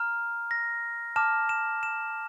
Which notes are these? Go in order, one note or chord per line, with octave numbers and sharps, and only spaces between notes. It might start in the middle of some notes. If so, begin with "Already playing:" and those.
Already playing: A#5 F6
A#6
A5 D6 F6 E7
E7
E7